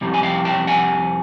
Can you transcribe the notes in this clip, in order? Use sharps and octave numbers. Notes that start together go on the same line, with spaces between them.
F2 C3 G3
G#5
F5 G5
G5 A5
F#5 G#5